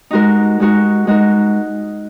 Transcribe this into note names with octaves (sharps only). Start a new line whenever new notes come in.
G#3 D#4 F#4 A#4
G#3 D#4 F#4 A#4
G#3 D#4 F#4 A#4